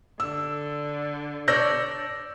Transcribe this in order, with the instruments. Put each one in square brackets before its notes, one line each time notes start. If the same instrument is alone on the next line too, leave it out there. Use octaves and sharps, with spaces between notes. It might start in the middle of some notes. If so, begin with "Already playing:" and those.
[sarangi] D3 [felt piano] E6
[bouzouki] D4 C#5 D5 [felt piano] E6 G6 A#6